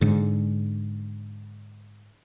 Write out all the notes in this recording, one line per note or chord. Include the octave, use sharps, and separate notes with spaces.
G#2 D3